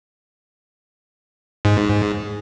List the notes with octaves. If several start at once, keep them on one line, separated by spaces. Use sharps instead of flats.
G#2